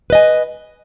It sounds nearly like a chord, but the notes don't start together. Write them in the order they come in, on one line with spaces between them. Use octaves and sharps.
B4 D#5 G#5